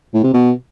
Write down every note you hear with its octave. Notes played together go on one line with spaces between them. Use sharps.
A2
C3
B2